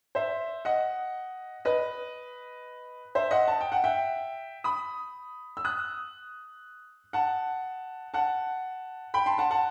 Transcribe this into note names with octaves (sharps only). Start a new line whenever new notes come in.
C5 E5
D#5 F#5
B4 D#5
C5 E5
D#5 F#5
A5
G5
F#5
E5 G5
B5 D#6
E6
D#6 F#6
F#5 A5
F#5 A5
G5 B5
A5 C6
F#5 A5
F#5 A5